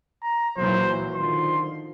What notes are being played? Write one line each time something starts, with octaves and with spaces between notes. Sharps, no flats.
A#5
A#2 E3 F#3 C5
D3 D#3 F3 C6